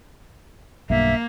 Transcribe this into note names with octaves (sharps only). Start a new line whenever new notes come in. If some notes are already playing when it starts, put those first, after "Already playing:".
B1 G2 A#3 E5